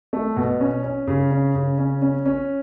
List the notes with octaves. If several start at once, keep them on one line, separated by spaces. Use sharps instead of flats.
A3
B2
C#4
C#4
C#3
C#4
C#3
C#4
C#4
C#4